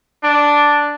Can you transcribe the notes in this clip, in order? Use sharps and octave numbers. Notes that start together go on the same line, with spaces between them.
D4